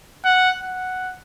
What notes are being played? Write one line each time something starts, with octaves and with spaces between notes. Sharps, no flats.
F#5
F#5